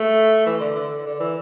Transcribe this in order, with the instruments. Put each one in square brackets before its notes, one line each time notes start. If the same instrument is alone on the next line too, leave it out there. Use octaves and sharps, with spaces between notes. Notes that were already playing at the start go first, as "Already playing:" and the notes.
Already playing: [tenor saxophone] A3
E3
D3
D3
D3
E3